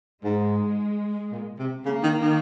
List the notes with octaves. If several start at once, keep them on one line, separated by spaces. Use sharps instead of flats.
G#2 G#3
A#2
C3
C#3 A#3
D#3
D#3